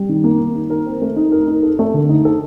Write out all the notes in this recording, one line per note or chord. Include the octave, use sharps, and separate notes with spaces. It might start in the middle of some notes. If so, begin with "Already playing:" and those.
Already playing: G3
D#3
A#3
D#3
D#4
A#4
C4
A3
D#4
A#4
D#4
A4
A3
D3
D#4
A4